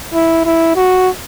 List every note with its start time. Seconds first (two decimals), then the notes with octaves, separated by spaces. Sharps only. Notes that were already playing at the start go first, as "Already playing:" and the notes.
0.14 E4
0.45 E4
0.76 F#4